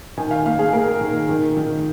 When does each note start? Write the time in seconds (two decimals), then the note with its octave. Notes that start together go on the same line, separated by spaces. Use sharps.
0.17 D#3 G#5
0.31 F5
0.46 A#3 F5
0.59 G#4
0.73 A#3 A#4
1.01 D#3
1.29 D#3
1.57 D#3